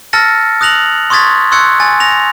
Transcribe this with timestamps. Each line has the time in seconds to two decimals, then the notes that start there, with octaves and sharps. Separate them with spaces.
0.13 A5 E6 F6 A6 A#6 C#7
0.61 D#6 F#6 A#6 F7 F#7
1.10 C6 C#6 D#6 G#6 A6 B6
1.51 C6 C#6 E6 F#6 G#6 C#7
1.80 G#5 A6
2.00 A#6 F7